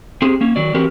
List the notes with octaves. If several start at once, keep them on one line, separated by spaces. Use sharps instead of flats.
C4 G4 G#4
A#3 C#4
D#3 F#3 D5
E3 C4 F#4 G4 A#4